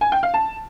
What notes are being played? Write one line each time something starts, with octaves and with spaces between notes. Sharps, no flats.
G#5
G5
F5
A5